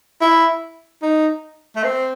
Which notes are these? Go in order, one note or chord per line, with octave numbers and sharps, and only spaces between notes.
E4
D#4
A3
C4